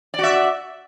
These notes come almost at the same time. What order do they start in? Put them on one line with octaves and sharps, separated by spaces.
D5 F#4 E5